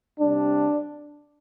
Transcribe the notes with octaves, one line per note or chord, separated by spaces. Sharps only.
C3 G3 D4